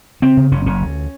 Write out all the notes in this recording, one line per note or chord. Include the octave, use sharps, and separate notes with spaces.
C#3 C4
C#3
F#1 C#4
F#1 C#4
D2